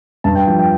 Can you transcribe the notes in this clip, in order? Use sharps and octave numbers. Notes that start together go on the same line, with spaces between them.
G2 A5
G5
F3 G5
G5